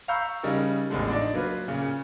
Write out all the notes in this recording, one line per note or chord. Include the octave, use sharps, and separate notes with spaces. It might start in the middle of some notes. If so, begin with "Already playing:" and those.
F5 A#5 B5 C#6 E6 G6
C#3 G3 D#4 A#4
A1 E2 D3 F3 G#3 A3
D4 D#4 D5
F#3 A#3 F4 B4
A#2 C#3